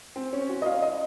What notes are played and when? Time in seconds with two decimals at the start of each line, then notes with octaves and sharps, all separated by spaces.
0.16 C4
0.33 C#4
0.49 F#4
0.62 D#5
0.66 F5
0.82 D#5